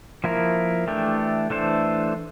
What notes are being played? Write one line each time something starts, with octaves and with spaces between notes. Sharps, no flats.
F3 A#3 E4 A#4
E3 A3 D4 G4
E3 A3 D4 A4 C5